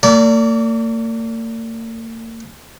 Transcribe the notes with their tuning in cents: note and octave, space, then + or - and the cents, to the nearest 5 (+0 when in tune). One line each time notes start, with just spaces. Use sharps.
A#3 -45 D5 -25